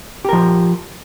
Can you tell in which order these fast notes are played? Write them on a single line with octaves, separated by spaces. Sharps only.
G4 A#4 F3